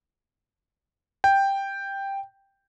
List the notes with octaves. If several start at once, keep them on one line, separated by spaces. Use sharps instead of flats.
G5